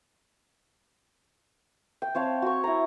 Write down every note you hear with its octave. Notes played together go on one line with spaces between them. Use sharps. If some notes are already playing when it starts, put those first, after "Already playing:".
G5
C4 C#5 F5 A5
F#4 C#6
E4 A#5